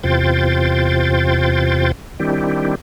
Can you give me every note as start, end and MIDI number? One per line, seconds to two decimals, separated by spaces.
0.03 1.92 40
0.03 1.92 48
0.03 1.92 65
0.03 1.92 72
0.03 1.92 79
0.03 1.92 93
2.20 2.75 51
2.20 2.75 55
2.20 2.75 60
2.20 2.75 62
2.20 2.75 64
2.20 2.75 67